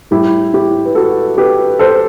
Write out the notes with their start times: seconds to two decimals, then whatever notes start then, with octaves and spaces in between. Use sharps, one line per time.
0.11 A2 G3 E4 G4
0.53 E4 G4
0.85 B4
0.95 F#4 A4
1.38 G4 B4
1.79 A4 C5